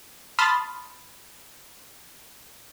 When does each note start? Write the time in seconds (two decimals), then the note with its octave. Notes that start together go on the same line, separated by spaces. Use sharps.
0.39 A5 B5 C6 D#6 F6 A6